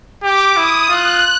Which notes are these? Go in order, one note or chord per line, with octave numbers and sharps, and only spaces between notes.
G4 D6
E4 D#6
F4 F#6